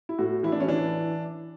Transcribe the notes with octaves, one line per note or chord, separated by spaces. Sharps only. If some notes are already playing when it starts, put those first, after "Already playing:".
E4
A2 F#4
E3 E4
D4
C#4
E3 D4